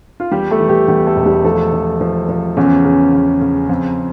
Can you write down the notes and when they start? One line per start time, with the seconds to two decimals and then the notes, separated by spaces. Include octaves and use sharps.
0.20 F4
0.31 E2 G3 G4
0.51 A3 A4
0.60 E3
0.69 G3 G4
0.88 E2 G3 G4
1.07 A3 A4
1.16 E1
1.26 G3 G4
1.44 F3 A3 A4
1.73 F3
2.01 F3
2.29 F3
2.57 E2 C#3 C#4
2.84 C#3
3.13 E2
3.41 C#3
3.69 F2